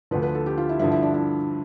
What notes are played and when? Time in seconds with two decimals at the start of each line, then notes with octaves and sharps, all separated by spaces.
0.11 D2 D3 F3 B4
0.23 B4
0.35 A4
0.46 G4
0.58 F4
0.69 E4
0.79 G2 D3 F3 E4
0.92 E4
1.03 D4
1.14 E4